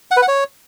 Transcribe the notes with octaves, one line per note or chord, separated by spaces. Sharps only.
F#5
B4
F#5
C#5